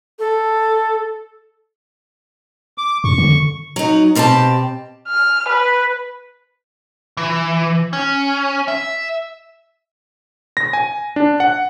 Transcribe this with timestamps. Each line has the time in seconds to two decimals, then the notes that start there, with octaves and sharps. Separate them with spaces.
0.19 A4
2.78 D6
3.04 F#2 C#6
3.18 D3
3.76 F#3 D#4
4.15 B2 C4 G4 E5 A5
5.08 F6
5.49 B4
7.17 E3
7.93 C#4
8.68 E5
10.57 A#6
10.73 G#5
11.16 D4
11.40 F#5